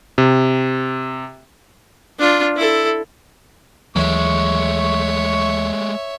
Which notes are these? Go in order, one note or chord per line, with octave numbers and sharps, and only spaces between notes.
C3
D4 F4
E4 A4
D#2 E3 F#3 G#3 A3 C#5 E5 C#6